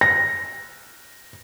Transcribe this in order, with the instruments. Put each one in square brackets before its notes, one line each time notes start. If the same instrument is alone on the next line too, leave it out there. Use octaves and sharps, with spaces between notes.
[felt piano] A#6